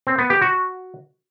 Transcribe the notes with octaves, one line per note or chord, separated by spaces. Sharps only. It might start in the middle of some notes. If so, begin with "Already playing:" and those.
C4
B3
G4
F#4